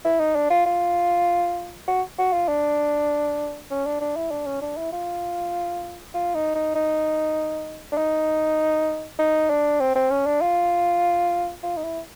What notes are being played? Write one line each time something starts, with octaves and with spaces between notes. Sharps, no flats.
E4
D#4
D4
F4
F4
F#4
F#4
F4
D4
C#4
D4
D4
E4
D4
C#4
D4
E4
F4
F4
D#4
D#4
D#4
D4
D#4
D#4
D4
C4
C4
C#4
D4
F4
F4
D#4
E4